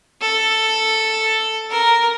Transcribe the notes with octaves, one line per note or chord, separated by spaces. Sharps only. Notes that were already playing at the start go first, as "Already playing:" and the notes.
A4
A#4